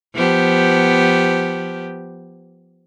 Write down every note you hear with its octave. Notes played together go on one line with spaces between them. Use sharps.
F3 B3 G4